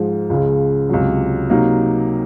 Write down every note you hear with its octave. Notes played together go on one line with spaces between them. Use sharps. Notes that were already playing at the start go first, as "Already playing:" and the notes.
Already playing: G#2 F3 G#3
C#2 C#3 G#3
C#2 C3 F#3
C3 F#3 A#3 D#4